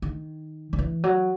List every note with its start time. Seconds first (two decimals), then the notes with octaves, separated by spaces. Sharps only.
0.02 D#3
0.73 D#3
0.79 E3
1.04 F#3